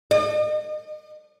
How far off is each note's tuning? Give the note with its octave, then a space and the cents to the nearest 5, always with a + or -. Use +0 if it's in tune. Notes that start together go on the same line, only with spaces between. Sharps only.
D#5 -40